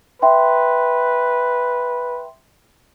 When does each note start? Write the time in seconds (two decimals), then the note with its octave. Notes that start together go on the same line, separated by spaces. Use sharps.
0.22 B4 E5 G5 C6